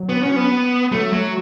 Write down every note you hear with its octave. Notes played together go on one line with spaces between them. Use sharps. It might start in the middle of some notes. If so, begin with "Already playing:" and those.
Already playing: F#3
B3
C#4
B3
F#3 A3
F#3 A3